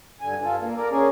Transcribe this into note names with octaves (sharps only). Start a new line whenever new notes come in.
G2 D3 G#5
G2 F4 A4
A#3
A#4 D5
C#4 G#4